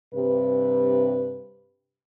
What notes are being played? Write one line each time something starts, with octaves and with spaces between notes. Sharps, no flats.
G2 C3 B4